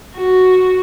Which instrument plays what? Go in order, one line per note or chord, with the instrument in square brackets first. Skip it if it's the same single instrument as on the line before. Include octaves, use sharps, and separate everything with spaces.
[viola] F#4